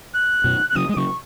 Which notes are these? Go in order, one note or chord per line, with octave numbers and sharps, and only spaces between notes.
F#6
F#2 B2
F#6
C#3 F#3 D#6
G#3 D#6
C#3 F#3 C#6